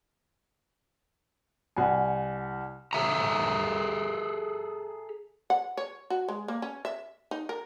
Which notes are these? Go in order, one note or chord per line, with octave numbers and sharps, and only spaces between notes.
C2 F#5 G#5
G#4 A4 E5 A#5
F#5
C#5
F#4
G#3
A#3
C#4
E5
D#4
A#4